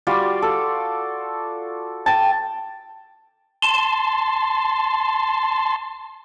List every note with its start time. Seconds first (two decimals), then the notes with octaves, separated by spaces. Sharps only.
0.07 G3 F4 F#4 D5
0.42 A4
2.06 G5 A5
3.62 A5 C6